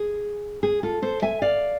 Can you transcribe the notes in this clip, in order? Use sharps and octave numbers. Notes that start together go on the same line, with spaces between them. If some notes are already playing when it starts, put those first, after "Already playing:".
Already playing: G#4
G#4
F4 A4
A4 C5
E5 G#5
D5 F5